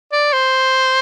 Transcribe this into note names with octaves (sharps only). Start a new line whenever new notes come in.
D5
C5